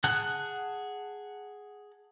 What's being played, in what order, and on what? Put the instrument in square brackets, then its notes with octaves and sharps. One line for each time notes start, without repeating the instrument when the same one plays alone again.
[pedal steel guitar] G#4 F#5 A5 F#6